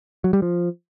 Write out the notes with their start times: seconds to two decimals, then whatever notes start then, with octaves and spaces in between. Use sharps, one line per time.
0.24 F#3
0.33 G3
0.42 F3